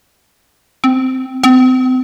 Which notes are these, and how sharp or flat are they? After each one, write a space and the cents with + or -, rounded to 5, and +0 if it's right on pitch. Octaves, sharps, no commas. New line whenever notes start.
C4 -10
C4 -35